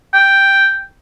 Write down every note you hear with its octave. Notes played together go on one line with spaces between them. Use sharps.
G5